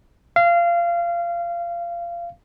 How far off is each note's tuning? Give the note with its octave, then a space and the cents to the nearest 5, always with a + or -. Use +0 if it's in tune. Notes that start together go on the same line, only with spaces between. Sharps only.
F5 -25